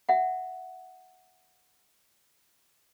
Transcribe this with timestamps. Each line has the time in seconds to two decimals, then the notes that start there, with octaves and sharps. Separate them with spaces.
0.09 E5 F#5